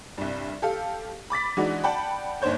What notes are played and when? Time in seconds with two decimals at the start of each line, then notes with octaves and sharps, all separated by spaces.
0.18 C2 G2
0.62 G4 A4 F5
1.30 B5 D6 A6 B6
1.57 E3 G#3 D4 D#4 F#4
1.84 D5 F#5 G5 A5 B5
2.42 G1 D#2 D4 C5 C#5 G6